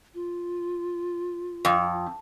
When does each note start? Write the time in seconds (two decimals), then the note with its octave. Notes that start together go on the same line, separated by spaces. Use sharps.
0.14 F4
1.65 F2